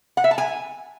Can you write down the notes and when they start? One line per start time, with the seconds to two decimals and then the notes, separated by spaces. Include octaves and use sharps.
0.17 F#5
0.24 E5
0.31 A5
0.38 G#5